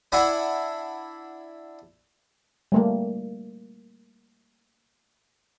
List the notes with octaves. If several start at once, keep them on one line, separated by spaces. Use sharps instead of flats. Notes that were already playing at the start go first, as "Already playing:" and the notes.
D4 E4 F#5 G#5 B5
G3 A3 A#3